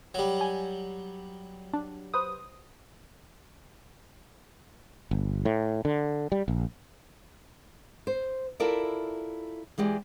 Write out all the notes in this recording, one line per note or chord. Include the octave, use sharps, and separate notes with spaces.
F#3 G3
G#5
D4
B4 C5 D#6
G1
A2
D3
G3
A#1
C5
E4 F4 A4 A#4 D5 E5
E3 G#3 G4 D5